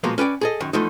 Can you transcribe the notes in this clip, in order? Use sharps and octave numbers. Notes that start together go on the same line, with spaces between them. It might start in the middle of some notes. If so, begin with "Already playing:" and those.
A#2 F3 F#3 G#3 A#3 B3
C#4 B4 D5 G5
G#4 A4 D#5
F#2 D#3
E2 F3 A3 D#4